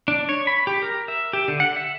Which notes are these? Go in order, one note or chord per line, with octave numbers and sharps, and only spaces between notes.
D4
C#5
B5
G4
A#4
E5
G4
D3
F#5
E5